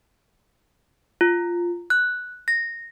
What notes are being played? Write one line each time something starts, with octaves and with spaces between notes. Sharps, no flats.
F4
F#6
A#6